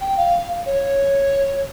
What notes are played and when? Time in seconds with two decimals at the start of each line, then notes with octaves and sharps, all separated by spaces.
0.01 G5
0.17 F5
0.66 C#5